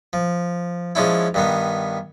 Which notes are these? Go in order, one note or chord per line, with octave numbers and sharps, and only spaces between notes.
F3
F3 G#3 C#4 D4 E4
G2 D#3 B3